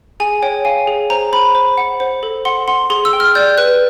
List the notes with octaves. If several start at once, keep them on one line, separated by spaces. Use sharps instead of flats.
G#4 G#5
C#5 G5
F5 G#5
G#4
C5 A#5
C5 B5
C5
F#5
C5
A4
F#5 C6
F#5 C6
G#4 C6
E6
G5
F6
D5 G6
B4 F#6